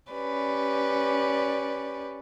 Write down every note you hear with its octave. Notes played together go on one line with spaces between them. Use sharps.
C#4 G4 B4 D5